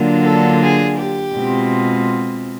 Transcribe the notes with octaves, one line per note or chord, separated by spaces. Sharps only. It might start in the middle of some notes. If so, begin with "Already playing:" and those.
Already playing: D3 F#3 A#3 D4 F4
A4
G#4
G4
B2 G#3 C4 F4